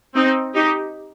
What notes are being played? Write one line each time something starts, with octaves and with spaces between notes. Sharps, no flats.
C4 D#4
D#4 G4